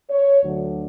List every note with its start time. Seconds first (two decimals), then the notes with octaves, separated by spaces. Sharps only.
0.11 C#5
0.43 D2 D3 F#3